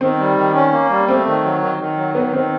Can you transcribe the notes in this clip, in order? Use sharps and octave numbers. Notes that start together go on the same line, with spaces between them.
D#3 C4
G3
D#3
C#4
A#3
G3
A3 C4
D#3
F#3
D#3
D#3
F#3
D#3 B3
D#3 C4